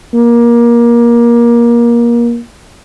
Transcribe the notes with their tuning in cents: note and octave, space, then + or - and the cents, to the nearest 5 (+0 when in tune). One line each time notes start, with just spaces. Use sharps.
A#3 +20